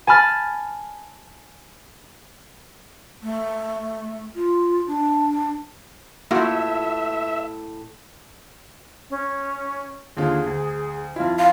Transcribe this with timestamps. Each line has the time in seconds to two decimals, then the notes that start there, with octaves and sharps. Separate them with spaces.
0.07 G#5 A5 B5 F6 A6
3.23 A3
4.35 F4
4.87 D4
6.31 A2 A#3 F4 F#4 E5
9.10 C#4
10.17 D#2 D3 F4 G#4
10.46 D2
11.16 F2 E4 F4
11.39 F5 C6